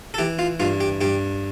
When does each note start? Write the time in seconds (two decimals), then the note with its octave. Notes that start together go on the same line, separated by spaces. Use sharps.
0.14 A4
0.18 E3 G4
0.39 F4
0.60 G2 F4
0.81 G4
1.01 G2 G4